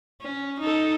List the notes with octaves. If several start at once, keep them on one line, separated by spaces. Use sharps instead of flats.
C#4
D#4 A4